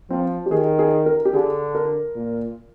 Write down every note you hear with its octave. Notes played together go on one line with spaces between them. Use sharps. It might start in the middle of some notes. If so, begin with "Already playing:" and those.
F3 C4
G4
D#3 G#4
G#4
A#4
G4
D3 G#4
A#4
A#2